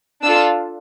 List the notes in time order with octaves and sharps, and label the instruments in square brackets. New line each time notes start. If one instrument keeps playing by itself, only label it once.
[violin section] D4 F4 A4 E6